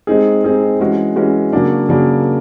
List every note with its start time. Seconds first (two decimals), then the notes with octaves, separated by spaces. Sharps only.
0.07 G#3 C4 D#4 G#4
0.44 G#3 C4 D#4 G#4
0.79 E3 G#3 C#4 F#4
1.16 E3 G#3 C#4 F#4
1.53 C#3 F#3 A#3 D4
1.89 C#3 F#3 A#3 D4